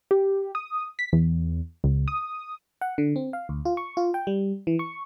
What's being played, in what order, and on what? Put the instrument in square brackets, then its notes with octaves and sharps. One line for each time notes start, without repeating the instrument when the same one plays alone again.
[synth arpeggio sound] G4
D#6
B6
E2
C#2
D#6
[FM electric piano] F#5
D3
C4
F5
D2
F4
C#6
F4
G5
G3
E3
C#6